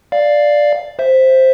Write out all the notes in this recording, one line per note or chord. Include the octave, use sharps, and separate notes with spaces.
D5 F5
C5 E5